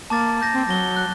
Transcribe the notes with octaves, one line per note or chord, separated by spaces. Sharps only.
A#3 A5 D6 A6
G6 A#6
C4
F#3 A#6 G7
F#6